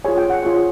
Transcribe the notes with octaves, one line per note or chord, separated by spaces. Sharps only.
F4 G#4 C#5 G#5
G5
F#5
F4 G#4 C#5